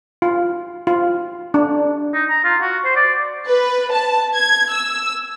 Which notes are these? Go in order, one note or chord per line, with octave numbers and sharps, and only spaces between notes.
F4
F4
D4
D#4
A#5
F4
F#4
C5
D5
B4
A5
G#6
E6